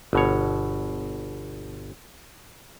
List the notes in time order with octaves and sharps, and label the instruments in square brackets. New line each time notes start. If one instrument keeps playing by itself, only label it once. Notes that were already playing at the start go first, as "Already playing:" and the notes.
[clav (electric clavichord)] G1 B2 C#5